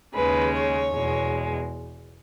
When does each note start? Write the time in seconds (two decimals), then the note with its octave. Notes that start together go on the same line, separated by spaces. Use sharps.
0.14 D#2 C#3 G#3 B4
0.54 C#5
0.93 E2 B2 G#3